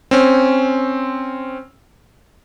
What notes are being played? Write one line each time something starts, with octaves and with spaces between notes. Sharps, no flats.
C4 C#4